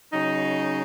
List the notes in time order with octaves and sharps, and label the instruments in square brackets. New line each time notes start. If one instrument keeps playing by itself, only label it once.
[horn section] C#3 F#3 D#4